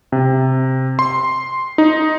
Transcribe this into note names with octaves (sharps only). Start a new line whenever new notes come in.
C3
C6
D#4